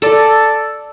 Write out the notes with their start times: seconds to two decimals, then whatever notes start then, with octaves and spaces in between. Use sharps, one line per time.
0.02 A4 D5